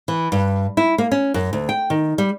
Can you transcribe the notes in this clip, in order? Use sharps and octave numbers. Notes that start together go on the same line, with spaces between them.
E3
G2
E4
A#3
C#4
F#2
D2
G5
D#3
G3